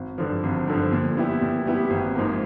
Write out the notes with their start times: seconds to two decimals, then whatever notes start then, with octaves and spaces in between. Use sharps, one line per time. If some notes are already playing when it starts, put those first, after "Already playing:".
Already playing: G#1
0.18 G2 D3 F3
0.43 G#1
0.67 G2 D3 F3
0.92 A#2
1.17 G3 B3 E4 G4
1.42 A#2
1.66 G3 B3 E4 G4
1.90 G#1
2.15 G#2 F3 A#3